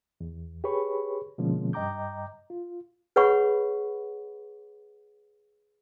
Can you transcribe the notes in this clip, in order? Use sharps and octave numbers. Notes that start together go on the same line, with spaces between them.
E2
G4 G#4 B4 C#5 B5 C#6
B2 D3 F3 G#3 A#3 C#4
G2 D#5 G5 A#5 D6 G6
F4
G#4 B4 C#5 F#5 B5 C#6